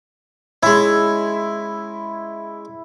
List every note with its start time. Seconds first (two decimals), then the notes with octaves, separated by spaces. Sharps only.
0.63 G#3 C#4 E4